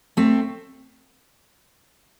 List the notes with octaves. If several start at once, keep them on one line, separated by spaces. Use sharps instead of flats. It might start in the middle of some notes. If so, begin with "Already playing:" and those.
A3 C4